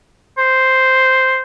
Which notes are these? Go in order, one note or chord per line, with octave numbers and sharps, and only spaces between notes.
C5